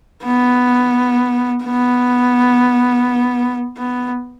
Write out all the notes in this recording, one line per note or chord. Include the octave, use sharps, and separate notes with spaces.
B3
B3
B3